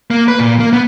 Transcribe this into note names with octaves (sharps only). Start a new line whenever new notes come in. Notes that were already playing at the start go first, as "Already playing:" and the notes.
A#3
B4
A#2
A#3
B3